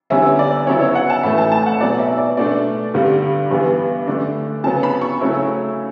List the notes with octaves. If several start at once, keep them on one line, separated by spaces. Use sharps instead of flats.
E2 D3 G3 C#4 E4 E5
D5
C#3 F#3 B3 E4 C#5
C#5
F#5
A5
A2 E3 A3 E4 B5
A5
A5
F#5
E2 B2 F#3 D5
E5
D5
B2 A3 D4 D5
G2 D3 G3
G2 E3 B3
D3 A3 D4
C#3 F#3 B3 A5
B5
C#6
C#3 F#3 A3 C#4 E4